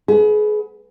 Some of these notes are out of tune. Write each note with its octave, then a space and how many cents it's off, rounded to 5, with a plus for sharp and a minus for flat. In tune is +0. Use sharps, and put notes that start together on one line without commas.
G#4 +30 B4 +0 F#5 +0